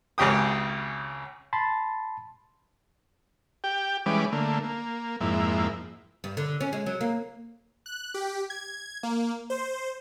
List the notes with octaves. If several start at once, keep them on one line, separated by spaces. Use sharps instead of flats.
G#1 C#2 C#3 G4 G5 D#6
A5 B5 C6 A6
G4 G5
E3 G3 G#3 C#4 B4 D6
D3 A3 A#3
A#3
F2 G#2 A#3 E4
G2
D3
C#4
G#3
F#3
A#3
F#6
G4
G#6
A#3
C5